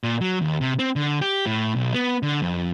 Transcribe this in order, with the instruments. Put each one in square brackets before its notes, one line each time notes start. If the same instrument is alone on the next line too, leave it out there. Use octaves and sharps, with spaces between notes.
[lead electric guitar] A#2
F#3
D#2
C3
C4
D3
G4
A2
B1
B3
D3
F2